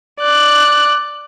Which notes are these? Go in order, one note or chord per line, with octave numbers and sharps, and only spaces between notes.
D5 F#6